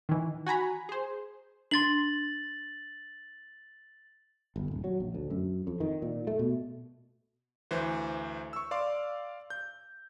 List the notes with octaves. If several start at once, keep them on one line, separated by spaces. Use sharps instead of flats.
D#3 E3
F#4 G#5 A#5 B5
G#4 C5
D4 C6 A6 F#7
G1
D#1
F#3
A#1
D2
F#2
F2
D#3
A#2
A3
B2
D2 E3 C5
C#6 E6
D5 F5 C6 D6
G6